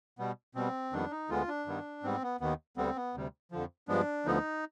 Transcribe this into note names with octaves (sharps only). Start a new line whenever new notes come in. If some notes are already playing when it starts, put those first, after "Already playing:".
B2 G3 B3
B2 G3 B3 C4
F2 D#3 G3 B3 D4
D#4
D2 D3 G#3 B3 F4
D4
G2 D#3 G3 B3
G#2 G3 B3 C4
B3
D#2 D#3 B3
D2 D3 G3 B3 C4
B3
D2 C3 G3
F2 D3 F3
G2 F3 G#3 B3 D4
D2 D3 F3 B3 D#4